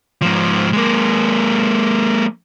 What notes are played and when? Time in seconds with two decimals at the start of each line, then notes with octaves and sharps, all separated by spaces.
0.22 G#2 F3
0.73 G#3 A#3